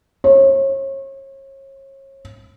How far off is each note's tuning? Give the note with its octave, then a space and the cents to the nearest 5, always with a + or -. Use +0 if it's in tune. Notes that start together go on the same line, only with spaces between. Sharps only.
C#5 -35